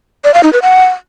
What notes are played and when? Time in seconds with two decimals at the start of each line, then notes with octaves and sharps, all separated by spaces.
0.24 D5
0.34 F5
0.43 D#4
0.53 B4
0.62 F#5